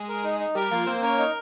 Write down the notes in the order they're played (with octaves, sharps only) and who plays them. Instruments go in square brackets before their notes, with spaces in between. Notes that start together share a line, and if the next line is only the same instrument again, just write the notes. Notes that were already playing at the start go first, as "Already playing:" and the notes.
Already playing: [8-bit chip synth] G#3 G#4
[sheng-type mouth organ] A#4
D#4
D#4
[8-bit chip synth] G3 G4 [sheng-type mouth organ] A#4
[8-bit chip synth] F3 F4 [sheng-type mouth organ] A#3
[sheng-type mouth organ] A#3 [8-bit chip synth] C4 C5
[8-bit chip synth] C#4 C#5 [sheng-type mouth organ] A#4
[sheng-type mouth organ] D#4